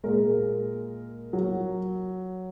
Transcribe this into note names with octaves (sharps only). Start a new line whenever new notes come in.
A#2 G#3 A#4
F#3